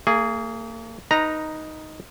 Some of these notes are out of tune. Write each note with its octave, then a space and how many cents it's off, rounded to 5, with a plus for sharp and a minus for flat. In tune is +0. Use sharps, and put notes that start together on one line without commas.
A#3 -40 G#4 +0
D#4 +0 B4 -20 A#5 +0